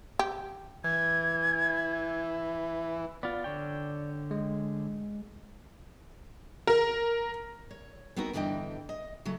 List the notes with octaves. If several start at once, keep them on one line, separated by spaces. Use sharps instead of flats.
G4
E3 G#6
B3 F4 D5
D3 C#5 G5
G#3
A#4
C#5
B3 C4 D#4 F#4 A#4
E2 G2 D3 E3 D#5 G5
D#5
C#3 F#3 A3